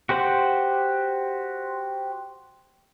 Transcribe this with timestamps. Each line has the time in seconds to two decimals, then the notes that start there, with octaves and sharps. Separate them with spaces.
0.09 F#4 G4 C5 F#5